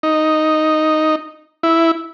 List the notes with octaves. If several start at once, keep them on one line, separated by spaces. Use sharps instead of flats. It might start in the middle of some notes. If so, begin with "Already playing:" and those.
D#4
E4